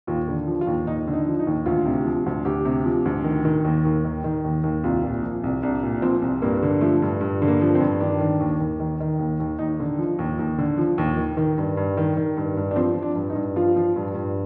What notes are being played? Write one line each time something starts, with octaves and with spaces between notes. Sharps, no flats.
D#2 F4
D3
F3
F4
D#2
D#2 D#4
D3
D#4
F3
D#4
D#2
D2 F4
C3
F3
D2
D2 G4
C3
F3
D2
D#3
D#3
D#2
D#2
D#3
D#3
D#2
D#2
C2 F4
A#2
F3
C2
C2 D4
A#2
F3 C4
C2
G2 A#3
D3
F3 A3
G2
G2
D3
A#3
F3
C4
G2
D#3 D4
D#3
D#2
D#2
D#3
D#3
D#2
D#2
D#2 D#4
D3
F3
D#2
D#2
D3
F3
D#2
D#3
D#3
G2
G2
D#3
D#3
G2
G2
D4
F3 C4
F3
D4
G2
D#4
G2
F3 F4
F3
G2
G2